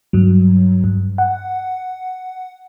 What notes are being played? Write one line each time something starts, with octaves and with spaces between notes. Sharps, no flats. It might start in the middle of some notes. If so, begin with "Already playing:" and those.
G2 F#3
G2
F#5